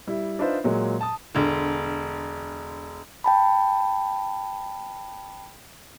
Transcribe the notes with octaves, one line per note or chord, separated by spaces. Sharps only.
G3 E4
D4 D#4 F4 B4 C5 E5
A#2 F#3 G#3
A5 D#6
E1 D3
G5 A5 B5